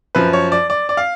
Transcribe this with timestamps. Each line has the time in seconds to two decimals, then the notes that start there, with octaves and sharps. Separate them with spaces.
0.15 F#2 F3 B4
0.33 C#5
0.52 D5
0.70 D5
0.89 D5
0.97 F5